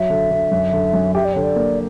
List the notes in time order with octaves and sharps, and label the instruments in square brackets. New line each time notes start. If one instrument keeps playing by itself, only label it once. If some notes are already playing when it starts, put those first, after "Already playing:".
Already playing: [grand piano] F#3 [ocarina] E5
[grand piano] D3
D3
F#2
D3
F#2
[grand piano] G4 [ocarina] E5
[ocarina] D5
[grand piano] D3 [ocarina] C#5
[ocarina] D5
[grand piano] A#3